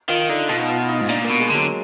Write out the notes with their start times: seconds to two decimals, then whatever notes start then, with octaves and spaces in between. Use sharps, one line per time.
0.08 D#3 F4
0.29 D3 D#4
0.49 B2 F4
0.59 D#4
0.68 F4
0.79 F4
0.89 D#4
0.98 F4
1.01 G#2
1.09 A#2 D4
1.25 A#3
1.30 B2
1.40 G#3
1.50 D3 F#3